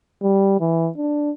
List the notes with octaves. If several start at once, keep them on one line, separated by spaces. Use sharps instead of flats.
G3
E3
D4